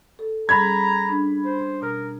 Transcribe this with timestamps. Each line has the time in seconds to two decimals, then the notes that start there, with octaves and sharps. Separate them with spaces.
0.19 A4
0.49 G3 C#4 G#4 A#5 B5 G#6
1.09 D4
1.45 C5
1.81 B2 A#4 A#5 F6